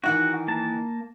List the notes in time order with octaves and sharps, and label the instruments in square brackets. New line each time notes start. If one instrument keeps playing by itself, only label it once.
[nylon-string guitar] D#3 E3 D#4 [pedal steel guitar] F#4 F#5
[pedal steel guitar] A#3 A5